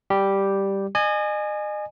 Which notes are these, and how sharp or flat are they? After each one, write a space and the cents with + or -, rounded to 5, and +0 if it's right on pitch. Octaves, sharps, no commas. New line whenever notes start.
G3 +0 G4 +0
D#5 -40 G#5 +0